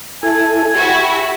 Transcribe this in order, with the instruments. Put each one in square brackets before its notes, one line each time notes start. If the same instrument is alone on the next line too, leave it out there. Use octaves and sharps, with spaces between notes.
[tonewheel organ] E4 A4 [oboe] G#5
[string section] E4 F#4 [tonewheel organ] G4